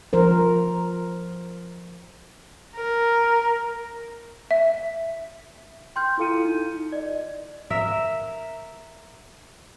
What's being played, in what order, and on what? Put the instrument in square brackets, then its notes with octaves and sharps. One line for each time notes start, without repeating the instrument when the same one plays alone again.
[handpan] F3 A#4 C5
[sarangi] A#4
[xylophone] E5
[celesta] G5 C6 F6 G6
E4 F4 A4 F5 C#7 D#7
D#4
D5 D#5
[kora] A#4 E5